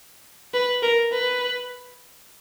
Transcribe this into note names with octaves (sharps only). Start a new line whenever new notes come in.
B4
A#4
B4